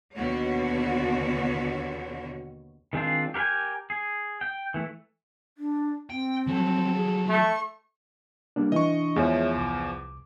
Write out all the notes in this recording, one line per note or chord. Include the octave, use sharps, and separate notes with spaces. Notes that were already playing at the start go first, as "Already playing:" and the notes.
D#2 B2 D3 F#4 C#5
D#3 G#3 C4 D4 F4
G4 A#4 B4 G5 G#5
G#4
G5
E3 A3
D4
C4 G5
F3 F#3 A4
G#4
A3 A4 C#6
G3 A#3 D4
E3 D4 D#5 C#6
E2 F3 G#3 C#5 E5
C2 D6